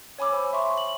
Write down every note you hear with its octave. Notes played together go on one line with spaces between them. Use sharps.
C#5 G#5 B5 D6 E6
C5 G#5 B5
E5 C6 C#6
F#7